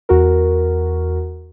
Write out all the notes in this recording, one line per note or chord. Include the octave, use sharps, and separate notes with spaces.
E2 F#4 A#4